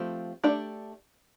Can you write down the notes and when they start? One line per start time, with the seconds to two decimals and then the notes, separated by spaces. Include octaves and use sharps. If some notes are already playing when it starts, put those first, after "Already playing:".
Already playing: F3 A3 C4 G4 C5
0.43 A3 D4 G4 D5